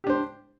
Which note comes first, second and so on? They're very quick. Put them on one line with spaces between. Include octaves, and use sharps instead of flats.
G4 D4 C5